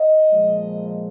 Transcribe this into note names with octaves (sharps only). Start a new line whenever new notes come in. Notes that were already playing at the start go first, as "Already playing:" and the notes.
Already playing: D#5
A#2 F3 G#3